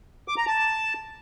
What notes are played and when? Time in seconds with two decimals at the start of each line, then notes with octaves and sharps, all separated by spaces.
0.28 D6
0.37 A#5
0.47 A5